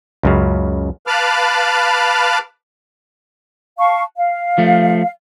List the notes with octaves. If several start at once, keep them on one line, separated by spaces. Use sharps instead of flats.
C#2 F#2 C#3
B4 F5 A5 B5 D6 F6
F5 A5 C#6
F5
F3 A3